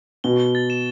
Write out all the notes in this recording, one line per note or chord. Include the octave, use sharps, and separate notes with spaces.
B2 G7
G7
A6
E7